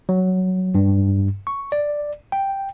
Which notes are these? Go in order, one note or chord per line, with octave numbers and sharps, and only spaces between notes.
F#3
G2
C#6
D5
G5